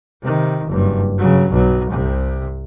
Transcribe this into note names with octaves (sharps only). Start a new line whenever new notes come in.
C3 D#3
F#1 G2
C#3 F#3
B1 F#3
C2 C3